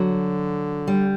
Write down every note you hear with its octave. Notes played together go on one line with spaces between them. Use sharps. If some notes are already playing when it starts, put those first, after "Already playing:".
Already playing: D3 F#3
G3